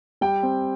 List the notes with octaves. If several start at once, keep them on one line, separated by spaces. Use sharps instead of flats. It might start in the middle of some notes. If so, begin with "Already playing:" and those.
G3 G5
C4